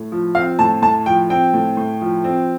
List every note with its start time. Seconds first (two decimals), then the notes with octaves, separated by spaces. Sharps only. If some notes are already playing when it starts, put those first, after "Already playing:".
Already playing: A2
0.12 F3
0.35 C4 F5
0.59 A2 A5
0.82 A2 A5
1.06 F3 G5
1.30 C4 G5
1.54 A2
1.77 A2
2.02 F3
2.24 C4